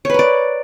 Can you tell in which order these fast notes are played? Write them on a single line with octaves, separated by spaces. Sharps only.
C#5 B4 A#4 D5